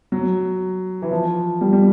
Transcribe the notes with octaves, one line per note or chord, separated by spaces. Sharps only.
F#3
E3
F3
G3
G3